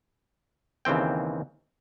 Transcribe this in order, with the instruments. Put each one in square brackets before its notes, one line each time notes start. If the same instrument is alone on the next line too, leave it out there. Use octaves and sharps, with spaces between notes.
[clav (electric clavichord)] D#2 C#3 E3 C4 G5